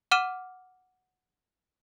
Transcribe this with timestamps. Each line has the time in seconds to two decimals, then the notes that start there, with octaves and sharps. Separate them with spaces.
0.11 F#5 D6 F6 D#7 E7